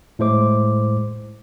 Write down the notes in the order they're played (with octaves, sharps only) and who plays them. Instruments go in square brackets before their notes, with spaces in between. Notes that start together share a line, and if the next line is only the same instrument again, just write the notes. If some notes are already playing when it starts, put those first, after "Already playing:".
[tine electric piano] A2 G#3 C5 D6